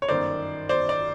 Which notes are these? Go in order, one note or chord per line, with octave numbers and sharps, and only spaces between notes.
C#5
G1 F#2 D#3 C5 D5
C5 D5
D5